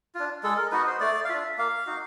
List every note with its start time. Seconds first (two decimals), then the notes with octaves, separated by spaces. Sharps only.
0.15 D4 F4
0.43 G#3 A4
0.57 A#4
0.71 B3 D#4 F#4 B4
0.87 C5
1.00 A3 D5
1.24 F5
1.29 D4 F4 E5
1.58 A#3 F5
1.87 D#4 F#4